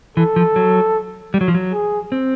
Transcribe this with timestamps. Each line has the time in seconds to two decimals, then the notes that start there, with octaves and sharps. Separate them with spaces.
0.17 E3 A4
0.36 F3
0.56 F#3
1.34 G3
1.41 F#3
1.48 F3
1.55 F#3
1.72 G#4
2.12 C4